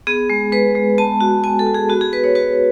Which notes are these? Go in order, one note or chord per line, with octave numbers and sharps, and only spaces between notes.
B3 G#4
G#3
G#3 B4
G#3
B3 A5
F#4
B3 G#5
A4
F#4
G#4
B3 F#4
G#4
F#4 B4
C#5
F#4 B4